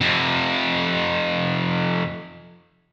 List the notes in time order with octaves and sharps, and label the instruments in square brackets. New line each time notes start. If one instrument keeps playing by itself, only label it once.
[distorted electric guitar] F2 C3